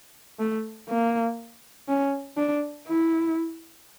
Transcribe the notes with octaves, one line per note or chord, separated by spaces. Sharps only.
A3
A#3
C#4
D4
E4